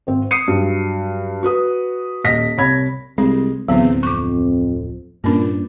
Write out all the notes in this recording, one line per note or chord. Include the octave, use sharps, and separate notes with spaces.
G#1 C4
D#6 C7 C#7 D#7
G2 F#3
F#4 B4 D#6
D#1 D#5 A#6 B6
C2 C#5 B5 G#6
C2 G#3 C4
D1 E2 D3 F#3 B3 C4
F2 C#6 D6
G2 A#2 A#3 C#4 D4